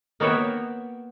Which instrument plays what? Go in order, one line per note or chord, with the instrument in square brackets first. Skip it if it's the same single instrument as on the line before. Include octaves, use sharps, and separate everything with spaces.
[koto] A#3 B3 F#4 C#5 E5 G5